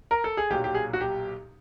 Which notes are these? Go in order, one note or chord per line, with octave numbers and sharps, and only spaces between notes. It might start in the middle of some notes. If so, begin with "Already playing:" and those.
A#4
A4
G#4
B1 A#2 F#3 G4
G4
G#4
F#4
G4